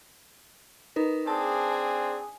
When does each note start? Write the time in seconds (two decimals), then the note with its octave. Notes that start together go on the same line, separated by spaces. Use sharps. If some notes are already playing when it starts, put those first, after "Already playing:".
0.96 D#4 A#4 B4
1.27 C4 D4 G#4 A5
1.72 G#5